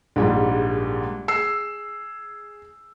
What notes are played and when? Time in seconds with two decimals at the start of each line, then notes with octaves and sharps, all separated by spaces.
0.16 A#1 G#2 G3
1.28 G#4 E6 C7